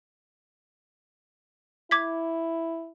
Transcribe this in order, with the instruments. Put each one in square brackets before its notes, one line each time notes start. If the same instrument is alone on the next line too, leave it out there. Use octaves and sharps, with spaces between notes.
[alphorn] E4 [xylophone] D6 G#6 B6